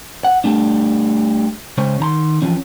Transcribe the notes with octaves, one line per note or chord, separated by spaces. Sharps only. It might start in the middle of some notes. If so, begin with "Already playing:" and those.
F#5
G3 A3 D4
C#3 G#3 C5 C#5
D#3 A#5 C6
E3 F3 C#4